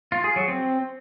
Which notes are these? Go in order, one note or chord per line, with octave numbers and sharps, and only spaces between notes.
F4
G#4
F#3
C4